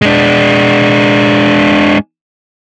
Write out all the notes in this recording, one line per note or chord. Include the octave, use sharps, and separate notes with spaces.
G#3 D4